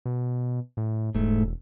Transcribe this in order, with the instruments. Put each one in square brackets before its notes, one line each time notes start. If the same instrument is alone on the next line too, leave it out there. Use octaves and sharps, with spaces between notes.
[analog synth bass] B2
A2
[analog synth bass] E1 [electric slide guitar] G#2 A3